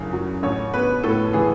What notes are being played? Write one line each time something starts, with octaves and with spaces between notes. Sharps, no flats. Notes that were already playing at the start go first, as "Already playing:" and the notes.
Already playing: F#1 E2 C#3
F#3
A1 C#5
B3 B4
A2 A4
E3 G#4